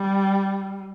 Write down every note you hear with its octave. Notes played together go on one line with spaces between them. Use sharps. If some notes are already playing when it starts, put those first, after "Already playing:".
Already playing: G3